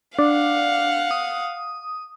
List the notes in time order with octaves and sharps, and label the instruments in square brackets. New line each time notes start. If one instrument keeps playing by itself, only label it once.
[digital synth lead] D4 [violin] F5 F#5
[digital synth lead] D#6